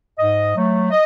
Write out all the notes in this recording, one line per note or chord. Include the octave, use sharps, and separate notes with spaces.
G#2 D#5
F#3 A3
D#5